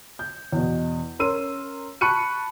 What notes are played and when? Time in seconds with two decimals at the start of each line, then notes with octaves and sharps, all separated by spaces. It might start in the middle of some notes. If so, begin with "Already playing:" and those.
0.19 G6
0.52 E2 B2
1.19 C#4 A#4 C6 E6 D#7
2.01 A5 B5 C#6 F#6 C#7 D#7